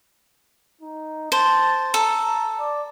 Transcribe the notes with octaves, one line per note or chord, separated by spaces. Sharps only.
D#4
C5 A5
A4 A#5
D5